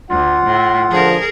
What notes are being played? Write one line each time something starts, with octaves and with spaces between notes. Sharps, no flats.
D2 F4 F#5
A2
D3 F3 G#4 A#4